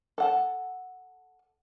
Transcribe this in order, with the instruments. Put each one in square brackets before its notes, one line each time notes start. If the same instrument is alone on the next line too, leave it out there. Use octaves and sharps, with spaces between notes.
[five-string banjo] A4 F#5 A5